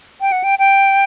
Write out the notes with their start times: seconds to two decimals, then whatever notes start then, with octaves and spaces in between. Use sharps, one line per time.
0.21 G5
0.32 F#5
0.44 G5
0.59 G5